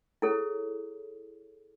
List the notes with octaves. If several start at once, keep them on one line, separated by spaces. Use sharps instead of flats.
E4 G#4 A4 C#5